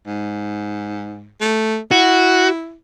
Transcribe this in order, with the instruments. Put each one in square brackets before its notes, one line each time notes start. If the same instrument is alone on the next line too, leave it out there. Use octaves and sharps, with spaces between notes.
[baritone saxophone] G#2
A3
[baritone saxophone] E4 [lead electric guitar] F#4